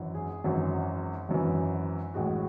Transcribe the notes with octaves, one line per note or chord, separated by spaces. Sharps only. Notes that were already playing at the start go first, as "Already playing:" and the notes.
Already playing: G#1 F#2 E3
G#4
G#1 F#2 E3
G#1 F#2 E3
A1 A2 G#3 F#4